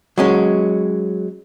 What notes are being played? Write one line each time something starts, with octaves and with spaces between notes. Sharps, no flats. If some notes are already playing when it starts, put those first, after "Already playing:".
F#3 G#3 C#4